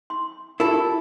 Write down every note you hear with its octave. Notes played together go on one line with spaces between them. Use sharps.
C6
E4 F4 G4 A4 A#4